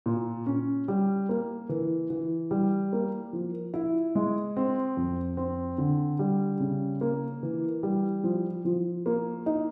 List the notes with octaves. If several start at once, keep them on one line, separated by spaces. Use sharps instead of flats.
A#2
C#4
G3
A#3
E3
E3
G3
A#3
F3
E4
G#3
C4
F2
C4
D3
G3
C#3
A#3
E3
G3
F3
F3
A#3
D#4